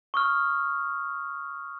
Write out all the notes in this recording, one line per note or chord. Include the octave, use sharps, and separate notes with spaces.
C#6 D#6 F6